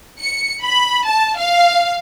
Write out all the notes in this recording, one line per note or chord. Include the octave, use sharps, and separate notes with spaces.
C#7
B5
A5
F5